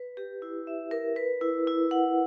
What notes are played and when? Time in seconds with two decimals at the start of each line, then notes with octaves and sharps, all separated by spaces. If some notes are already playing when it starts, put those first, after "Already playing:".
Already playing: B4
0.17 G4
0.42 E4
0.67 E5
0.91 A#4
1.16 B4
1.41 E4
1.67 E4
1.91 F#5